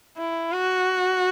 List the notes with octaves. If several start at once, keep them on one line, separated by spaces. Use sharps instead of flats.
E4
F#4